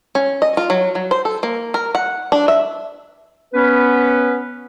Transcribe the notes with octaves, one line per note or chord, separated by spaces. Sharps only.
C#4
D#5
F4
F#3
F#3
C5
A4
A#3
A#4
F#5
D4
E5
B3 C#4 B4